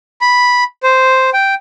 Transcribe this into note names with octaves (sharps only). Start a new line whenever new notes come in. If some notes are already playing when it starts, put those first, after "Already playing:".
B5
C5
G5